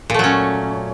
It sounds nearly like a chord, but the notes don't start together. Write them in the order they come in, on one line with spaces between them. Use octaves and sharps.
A#2 A3 F#3 C#4